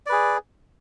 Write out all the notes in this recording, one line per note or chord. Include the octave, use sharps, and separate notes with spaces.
G#4 B4 D5